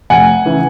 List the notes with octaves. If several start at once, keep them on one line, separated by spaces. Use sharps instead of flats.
F1 F#5 G#5
C#3 E3